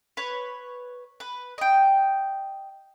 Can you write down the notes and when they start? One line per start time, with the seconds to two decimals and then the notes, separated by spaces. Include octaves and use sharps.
0.17 B4 C#5
1.20 B4
1.58 D#5 G5